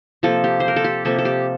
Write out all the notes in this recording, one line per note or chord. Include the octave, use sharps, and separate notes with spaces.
C3 F3 A#3 A4
G4
C5
A#4
A4
G4
C3 F3 A#3 A4
A4
G4